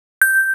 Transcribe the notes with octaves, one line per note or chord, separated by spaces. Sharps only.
G6